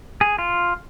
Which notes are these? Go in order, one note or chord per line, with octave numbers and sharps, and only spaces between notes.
G#4
F4